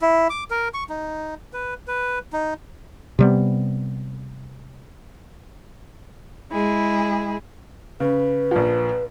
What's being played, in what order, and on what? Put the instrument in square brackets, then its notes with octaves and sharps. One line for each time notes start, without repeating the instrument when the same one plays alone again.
[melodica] E4
D6
A#4
C#6
D#4
B4
B4
D#4
[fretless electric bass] C3 G3 B3
[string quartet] G#3 E4 G#4
[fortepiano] C#3 [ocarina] B4
[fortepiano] A#1 F3